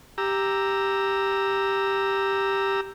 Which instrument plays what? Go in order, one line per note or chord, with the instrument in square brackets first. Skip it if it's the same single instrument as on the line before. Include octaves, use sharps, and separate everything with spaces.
[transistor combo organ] G4 A#5 E6